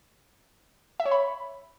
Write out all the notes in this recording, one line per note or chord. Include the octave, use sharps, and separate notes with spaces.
E5
C#5
B5